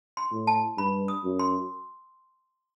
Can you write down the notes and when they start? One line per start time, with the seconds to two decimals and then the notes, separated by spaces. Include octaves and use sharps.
0.17 C6
0.32 A2
0.47 A5
0.78 G2 B5
1.08 D#6
1.24 F#2
1.39 C6